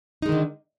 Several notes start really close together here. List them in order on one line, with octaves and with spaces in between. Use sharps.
D#4 G#3 D#3 D3